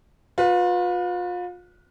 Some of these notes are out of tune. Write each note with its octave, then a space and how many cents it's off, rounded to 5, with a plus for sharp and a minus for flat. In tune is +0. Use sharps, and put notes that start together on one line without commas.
F4 +35 B4 +0